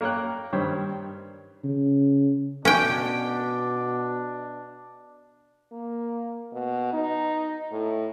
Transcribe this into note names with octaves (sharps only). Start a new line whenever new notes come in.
A#3 A#4 C#5 G5 F#6
G2 D#3 G3 C5 C#5
C#3
B2 C#4 D4 G5
A#3
B2
D#4
A2